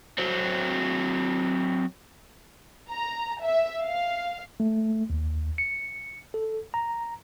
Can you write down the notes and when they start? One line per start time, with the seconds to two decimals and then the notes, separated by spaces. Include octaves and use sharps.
0.18 F#3 C4
2.88 A#5
3.42 E5
3.83 F5
4.60 A3
5.10 D#2
5.58 C#7
6.34 A4
6.74 A#5